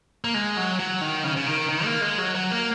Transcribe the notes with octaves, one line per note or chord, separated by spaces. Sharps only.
A#3
G#3
F#3
F#3
D#3
C#3
C#3
D#3
D#3
A#3
G#3
F#3
F#3
A#3